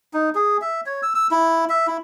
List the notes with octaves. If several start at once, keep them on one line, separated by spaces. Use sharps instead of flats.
D#4
G#4
E5
C#5
E6
E6
E4
E5
E4